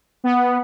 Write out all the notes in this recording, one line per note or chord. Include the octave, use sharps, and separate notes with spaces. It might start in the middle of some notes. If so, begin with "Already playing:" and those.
B3